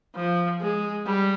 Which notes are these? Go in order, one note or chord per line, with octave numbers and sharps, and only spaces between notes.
F3
G#3
G3